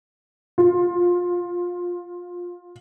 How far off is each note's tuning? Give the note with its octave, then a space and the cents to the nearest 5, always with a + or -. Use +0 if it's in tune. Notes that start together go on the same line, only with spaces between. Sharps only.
F4 +15